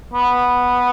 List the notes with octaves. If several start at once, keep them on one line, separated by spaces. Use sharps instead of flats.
B3